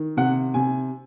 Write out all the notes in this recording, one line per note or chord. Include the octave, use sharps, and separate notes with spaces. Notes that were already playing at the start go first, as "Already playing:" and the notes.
Already playing: D#3
C3 F#5
C3 G#5